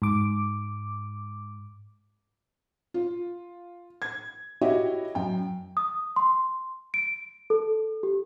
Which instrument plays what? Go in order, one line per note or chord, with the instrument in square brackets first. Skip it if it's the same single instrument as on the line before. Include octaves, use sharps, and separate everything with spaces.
[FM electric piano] G#2 D6
[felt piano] F4
G#6
E4 F#4 G4 C#5 D#5
F#2 G5
[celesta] D#6
C6
D7
A4
G4